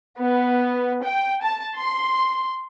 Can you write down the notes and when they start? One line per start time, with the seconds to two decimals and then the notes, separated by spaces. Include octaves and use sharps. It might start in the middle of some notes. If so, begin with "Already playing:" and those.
0.18 B3
1.02 G5
1.42 A5
1.76 C6